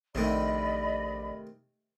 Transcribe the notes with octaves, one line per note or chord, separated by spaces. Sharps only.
A#1 C3 D#3 A3 D5 D#5 B5